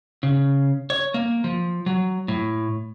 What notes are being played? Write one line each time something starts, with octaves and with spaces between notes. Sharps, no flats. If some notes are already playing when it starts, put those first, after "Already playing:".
C#3
C#5
A#3
F3
F#3
A2